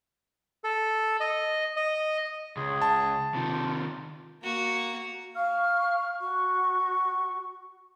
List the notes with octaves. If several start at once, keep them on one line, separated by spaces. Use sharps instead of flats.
A4
D#5
D#5
C#2 G#4
A5
C3 D#3 F4
A#3 F#4
F5 C#6 F6
F#4 C#6